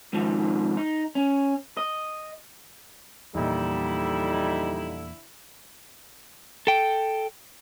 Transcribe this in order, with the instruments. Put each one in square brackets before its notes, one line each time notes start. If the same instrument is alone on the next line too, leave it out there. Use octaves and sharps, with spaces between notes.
[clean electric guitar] G#2 D#3 F3
D#4
C#4
D#5
[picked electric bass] E2 A#2 [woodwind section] D3 E4 [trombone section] F3 G3 D#4
[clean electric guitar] A4 G5